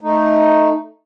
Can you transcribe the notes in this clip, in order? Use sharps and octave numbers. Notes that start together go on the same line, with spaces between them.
A3 D#4